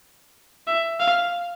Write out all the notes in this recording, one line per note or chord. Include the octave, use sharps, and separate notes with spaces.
E5
F5